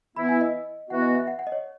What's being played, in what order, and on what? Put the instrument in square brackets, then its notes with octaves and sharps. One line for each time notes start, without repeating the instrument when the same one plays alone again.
[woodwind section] E3 B3 E4 [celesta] B5
[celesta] G#5
D#5
[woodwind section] E3 B3 F#4 [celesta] F#5
[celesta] D#5
E5
F#5
F#5
D#5
C#5